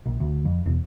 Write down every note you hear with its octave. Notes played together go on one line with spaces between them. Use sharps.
A#1
D2
F2
E1